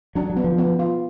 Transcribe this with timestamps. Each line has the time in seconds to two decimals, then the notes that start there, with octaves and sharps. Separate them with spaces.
0.15 F#3 D4
0.30 F#3
0.37 B3
0.44 F3
0.58 B3
0.79 F4